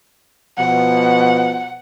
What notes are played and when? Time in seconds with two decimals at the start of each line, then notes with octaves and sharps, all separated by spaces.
0.58 B2 F3 F#5